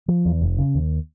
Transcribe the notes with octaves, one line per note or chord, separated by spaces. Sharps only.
F3
E2
F1
C#3
D#2